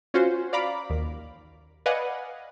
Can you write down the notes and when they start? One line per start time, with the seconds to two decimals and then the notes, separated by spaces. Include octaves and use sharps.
0.14 C#4 F4 F#4 C5
0.53 D5 F5 A#5 B5 D6
0.90 D#2
1.86 B4 D5 D#5 F5 F#5 G#5